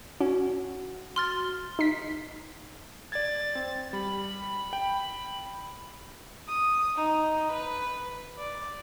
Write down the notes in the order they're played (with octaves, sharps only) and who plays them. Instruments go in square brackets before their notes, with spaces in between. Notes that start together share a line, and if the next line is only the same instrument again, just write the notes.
[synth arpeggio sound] C#4 [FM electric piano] F#4
[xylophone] C6 F6 A6
[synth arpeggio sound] D#4 B6
[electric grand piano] D5 G#6 [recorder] A6
[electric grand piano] C4
[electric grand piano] G3 [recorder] B5
[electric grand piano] G5
[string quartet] D#6
D#4
B4
D5